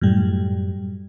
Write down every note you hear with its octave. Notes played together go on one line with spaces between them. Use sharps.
F#2 A2 G3